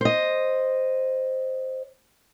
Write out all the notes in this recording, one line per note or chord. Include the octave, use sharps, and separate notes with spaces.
C5 D#5